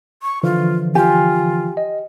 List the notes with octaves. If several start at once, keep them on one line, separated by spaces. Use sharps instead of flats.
C#6
D3 E3 F3 F4
F4 G4 G#5
D#5